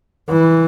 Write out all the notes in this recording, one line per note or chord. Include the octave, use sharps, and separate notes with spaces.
E3